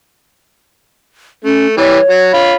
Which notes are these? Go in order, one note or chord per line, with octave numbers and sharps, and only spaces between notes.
A3 C#4
E3 G3 C#5
F#3
F4 B5